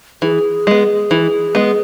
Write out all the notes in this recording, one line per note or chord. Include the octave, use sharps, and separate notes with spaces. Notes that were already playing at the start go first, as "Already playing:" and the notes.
E3 G#4
G#3 B3
E3
G#3 B3